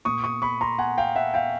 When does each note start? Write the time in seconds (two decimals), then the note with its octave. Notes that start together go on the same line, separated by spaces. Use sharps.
0.05 A#2 C#6 D#6
0.24 C#6 D#6
0.42 B5 C#6
0.61 A#5 C6
0.79 F#5 G#5
0.98 F5 G5
1.16 E5 F#5
1.34 F5 G5